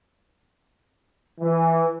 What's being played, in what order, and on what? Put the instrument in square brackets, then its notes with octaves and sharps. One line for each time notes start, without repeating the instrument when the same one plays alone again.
[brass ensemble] E3